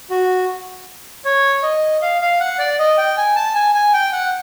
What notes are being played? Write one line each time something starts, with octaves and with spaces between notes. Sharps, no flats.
F#4
C#5
D#5
F5
F5
F#5
D5
D#5
G5
G#5
A5
G#5
G#5
G5
F#5